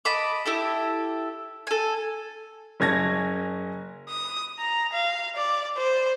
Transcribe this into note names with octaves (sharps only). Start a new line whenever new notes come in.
D#5 A5 B5 D6
E4 G4 A4
A4 G#5
F#1 C#4 G#6 A#6
D#6
A#5
F5
D5
C5